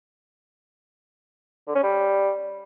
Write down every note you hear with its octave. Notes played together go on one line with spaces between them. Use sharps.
D3
C#4
G3